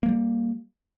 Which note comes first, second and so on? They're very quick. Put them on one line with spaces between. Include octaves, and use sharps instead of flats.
A#3 G#3 G3